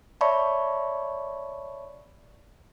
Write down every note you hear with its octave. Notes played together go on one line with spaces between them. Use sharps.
C#5 D5 E5 A5 B5 C#6